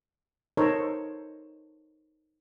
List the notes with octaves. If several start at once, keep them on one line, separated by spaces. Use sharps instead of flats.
D#4 A4 A#4 C5 C#5